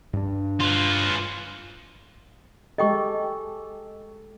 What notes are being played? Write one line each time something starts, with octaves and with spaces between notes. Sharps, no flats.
G2 D4
F4 B4
G#3 G4 A4 D#5 G5 C#6